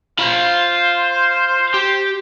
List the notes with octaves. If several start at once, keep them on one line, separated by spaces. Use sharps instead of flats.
F4 C5 B5
G4